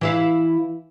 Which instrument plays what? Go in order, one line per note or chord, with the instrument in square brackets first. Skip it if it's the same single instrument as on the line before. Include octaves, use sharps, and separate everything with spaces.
[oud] E3 E4 F5